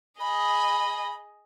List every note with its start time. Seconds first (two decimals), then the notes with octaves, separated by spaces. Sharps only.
0.20 G#4 D#5 B5